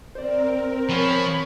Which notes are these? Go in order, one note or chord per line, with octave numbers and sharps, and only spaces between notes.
C4 A#4 C5 D5
B2 F3 G#4 C#5 B5